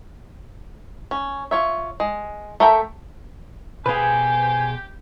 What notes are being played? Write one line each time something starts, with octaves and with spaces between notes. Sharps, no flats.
C#4
F4 C#5 E5
G#3
A3 A4 A#4 E5 G5
B2 G4 G#4 B4 C5 F5 G#5